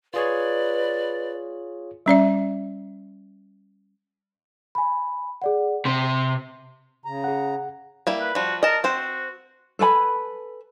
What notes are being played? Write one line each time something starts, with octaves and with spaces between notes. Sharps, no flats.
F4 G#4 B4 C#5 D5
G3 C#4 D5 E5
G#5 B5
G#4 D5 F#5
C3 C6
C#3 A#5
G#4 F#5
G3 A#3 E4
B4
F3 G3 F#4
A#4 D#5 A5
C4 F#4 C5
A4 B4 G#5 B5